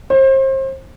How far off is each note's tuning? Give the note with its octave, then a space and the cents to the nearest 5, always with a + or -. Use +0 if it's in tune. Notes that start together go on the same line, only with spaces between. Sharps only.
C5 +35